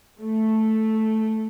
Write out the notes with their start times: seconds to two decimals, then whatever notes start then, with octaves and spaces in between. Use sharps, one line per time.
0.20 A3